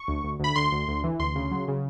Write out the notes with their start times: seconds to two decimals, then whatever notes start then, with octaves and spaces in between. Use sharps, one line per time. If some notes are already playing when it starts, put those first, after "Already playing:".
Already playing: C#6
0.08 D2
0.24 D2
0.40 D2 B5
0.56 D2 C6
0.72 D2
0.88 D2
1.04 E3
1.19 D2 C6
1.36 C#3
1.51 F#3
1.68 C#3